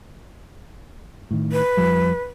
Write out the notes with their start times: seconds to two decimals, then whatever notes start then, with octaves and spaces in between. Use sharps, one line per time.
1.31 A2 D#3
1.52 B4
1.77 F2 F3 G3